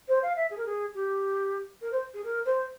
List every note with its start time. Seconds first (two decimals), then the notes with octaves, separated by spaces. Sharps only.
0.08 C5
0.23 F5
0.36 E5
0.51 G#4
0.58 A#4
0.66 G#4
0.95 G4
1.82 A#4
1.92 C5
2.14 G#4
2.24 A#4
2.45 C5